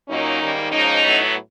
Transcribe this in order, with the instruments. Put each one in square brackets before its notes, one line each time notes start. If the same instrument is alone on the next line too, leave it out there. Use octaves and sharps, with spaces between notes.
[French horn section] A#2 F#3 A#3 C#4 D#4
G#2 D#3 G3 A#3
G#2 F3 A#3 C#4 D#4
A2 F#3 B3